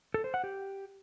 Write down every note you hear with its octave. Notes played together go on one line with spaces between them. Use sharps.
A4
C5
F#5
G4